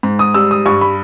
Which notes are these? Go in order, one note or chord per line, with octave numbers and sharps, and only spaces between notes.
G#2
D#6
G3 E6
D#6
G2 C#6
B5